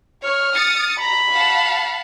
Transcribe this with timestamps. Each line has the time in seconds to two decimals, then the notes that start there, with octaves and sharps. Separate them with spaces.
0.24 C#5 F6
0.55 D#6 A6 C#7
1.00 A#5 B5
1.31 F5 F#5 A5